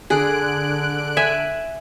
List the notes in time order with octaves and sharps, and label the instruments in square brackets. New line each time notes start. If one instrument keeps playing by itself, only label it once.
[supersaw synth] D3 F#6 D7 [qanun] G#4
[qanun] E5 G#5